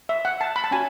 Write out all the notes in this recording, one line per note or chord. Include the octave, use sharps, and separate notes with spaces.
E5
F#5
A5
B5
A5
C#4 F#4 G#5